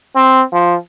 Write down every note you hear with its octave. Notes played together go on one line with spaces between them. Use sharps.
C4
F3